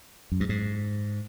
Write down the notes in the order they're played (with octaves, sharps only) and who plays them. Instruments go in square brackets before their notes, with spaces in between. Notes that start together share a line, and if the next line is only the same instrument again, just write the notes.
[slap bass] F#2
G2
G#2